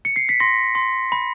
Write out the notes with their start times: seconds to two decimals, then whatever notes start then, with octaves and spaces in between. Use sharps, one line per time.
0.05 C#7
0.16 C7
0.29 B6
0.40 C6 A#6
0.75 C6
1.12 B5